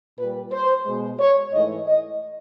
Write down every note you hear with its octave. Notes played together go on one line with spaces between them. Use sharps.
A#2 G3 B4
C5
B2 G#3
C#5
G#2 E3 A3 D#5
D#5